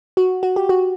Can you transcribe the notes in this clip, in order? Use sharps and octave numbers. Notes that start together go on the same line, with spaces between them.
F#4
F#4
G4
F#4